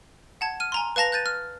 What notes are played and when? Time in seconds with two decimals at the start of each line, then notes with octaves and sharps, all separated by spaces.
0.41 F#5 A5 G#6
0.60 F6 D#7
0.72 G#5 A#5 C6
0.96 B4 F5 A5 A#6 F7
1.12 F#6 G6 A6 D#7
1.26 F6